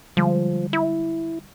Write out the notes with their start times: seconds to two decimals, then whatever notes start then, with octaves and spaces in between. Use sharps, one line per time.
0.17 D3 F3 G3 G#3
0.73 E4